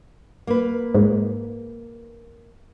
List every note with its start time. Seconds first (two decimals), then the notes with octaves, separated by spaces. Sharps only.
0.47 A#3 B4
0.95 G#2